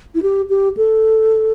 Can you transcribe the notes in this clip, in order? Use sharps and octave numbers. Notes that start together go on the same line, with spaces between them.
E4
G4
G4
A4